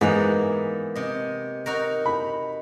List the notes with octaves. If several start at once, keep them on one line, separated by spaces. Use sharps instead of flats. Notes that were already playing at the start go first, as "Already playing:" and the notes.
G#2 E3 A#3 B3
C3 D#5
D#4 F#4 A#4
B5